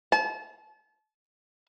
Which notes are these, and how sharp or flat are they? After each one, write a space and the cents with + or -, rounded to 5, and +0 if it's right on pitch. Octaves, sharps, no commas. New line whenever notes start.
A5 -30